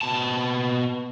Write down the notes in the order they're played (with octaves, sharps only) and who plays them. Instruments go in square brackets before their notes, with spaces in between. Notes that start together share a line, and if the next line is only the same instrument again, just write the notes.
[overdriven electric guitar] B2 A5